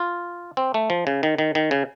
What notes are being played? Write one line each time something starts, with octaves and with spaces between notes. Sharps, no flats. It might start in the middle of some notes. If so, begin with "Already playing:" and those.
Already playing: F4
C4
A3
F3
C#3
D#3
D#3
D#3
C#3